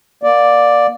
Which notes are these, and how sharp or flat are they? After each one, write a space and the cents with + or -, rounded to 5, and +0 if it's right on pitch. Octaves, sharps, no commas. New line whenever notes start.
A#3 +25 D5 +0